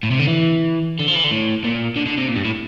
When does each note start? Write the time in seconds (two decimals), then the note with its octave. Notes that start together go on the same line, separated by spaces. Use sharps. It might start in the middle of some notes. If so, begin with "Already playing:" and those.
0.03 A2
0.11 C3
0.19 D3
0.27 E3
0.99 D3
1.08 F3
1.16 E3
1.24 D3
1.31 A2
1.64 A#2
1.96 D3
2.06 D3
2.18 C3
2.28 A#2
2.36 G2
2.45 A2